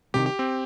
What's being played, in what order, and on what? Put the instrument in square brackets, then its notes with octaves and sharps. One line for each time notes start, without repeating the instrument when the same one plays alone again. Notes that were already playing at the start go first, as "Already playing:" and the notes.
[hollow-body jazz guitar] C2 C3 D#3 [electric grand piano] G4
[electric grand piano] G4
C4